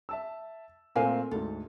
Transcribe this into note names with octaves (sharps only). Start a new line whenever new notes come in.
E5 A5 E6
A#2 A3 C4 A#4 F5 G#5
D2 G#2 A4